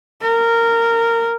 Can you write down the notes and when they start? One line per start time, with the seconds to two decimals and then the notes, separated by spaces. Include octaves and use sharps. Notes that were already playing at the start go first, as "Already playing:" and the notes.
0.22 A#4